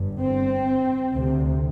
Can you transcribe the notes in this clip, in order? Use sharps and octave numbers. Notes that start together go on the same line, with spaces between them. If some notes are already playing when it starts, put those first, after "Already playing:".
Already playing: G1 G2
C4
D2 C3